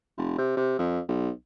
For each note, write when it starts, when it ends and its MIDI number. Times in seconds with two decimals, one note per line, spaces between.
0.17 0.34 29
0.38 0.54 48
0.57 0.75 48
0.79 1.00 41
1.08 1.30 35